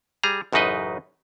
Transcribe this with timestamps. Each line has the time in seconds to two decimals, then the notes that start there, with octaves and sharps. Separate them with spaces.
0.23 G3 G#4 A#5
0.53 A1 F#2 C#3 D#4 B4 D#5